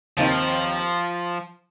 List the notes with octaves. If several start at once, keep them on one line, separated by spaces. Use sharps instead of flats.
D#2 D#3 F3 C4 D#4